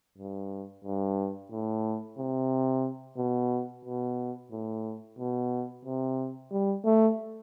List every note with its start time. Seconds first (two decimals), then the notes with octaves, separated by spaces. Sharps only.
0.18 G2
0.85 G2
1.52 A2
2.18 C3
3.17 B2
3.85 B2
4.51 A2
5.18 B2
5.85 C3
6.52 G3
6.85 A3